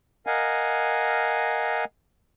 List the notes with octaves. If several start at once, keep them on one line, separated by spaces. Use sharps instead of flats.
A#4 D#5 F5 F#5 G#5